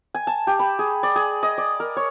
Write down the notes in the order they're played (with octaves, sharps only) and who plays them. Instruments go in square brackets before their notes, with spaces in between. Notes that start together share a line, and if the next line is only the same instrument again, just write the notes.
[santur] G#5
A5
G4
B5
G#4
D5
G#4
D#5
D5
A#4
C#5